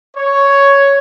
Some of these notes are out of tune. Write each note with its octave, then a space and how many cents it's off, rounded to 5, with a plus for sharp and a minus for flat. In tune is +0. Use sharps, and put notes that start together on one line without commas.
C#5 +5